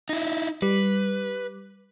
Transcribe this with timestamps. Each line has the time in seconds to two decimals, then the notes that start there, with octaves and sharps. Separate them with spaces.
0.09 D#4 E4
0.62 G3 B4